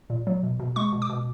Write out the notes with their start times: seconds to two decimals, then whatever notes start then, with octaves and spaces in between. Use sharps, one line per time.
0.10 A#2
0.27 F#3
0.43 B2
0.60 B2
0.76 G#3 C#6
0.92 B2
1.02 D6
1.10 B2